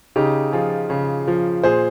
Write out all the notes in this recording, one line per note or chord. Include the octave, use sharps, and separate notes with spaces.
C#3 D#4 G4
F3 F4 G#4
C#3
F3
A#2 G#4 C5